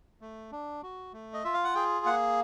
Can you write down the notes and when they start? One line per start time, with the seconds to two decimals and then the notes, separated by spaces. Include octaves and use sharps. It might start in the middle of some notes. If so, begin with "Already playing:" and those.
0.21 A3
0.52 D4
0.83 F#4
1.13 A3
1.34 D#5
1.44 F4 E5
1.54 F5
1.64 F#5
1.75 G#4 G5
2.06 A#3 F#5